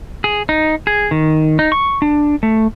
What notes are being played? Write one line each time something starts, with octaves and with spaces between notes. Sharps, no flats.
G#4
D#4
G#4
D#3
D#4
C#6
D4
A3